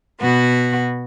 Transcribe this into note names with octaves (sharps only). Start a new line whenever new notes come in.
B2 B3 F#4